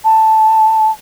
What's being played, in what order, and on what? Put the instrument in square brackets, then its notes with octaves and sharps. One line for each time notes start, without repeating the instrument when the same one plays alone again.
[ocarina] A5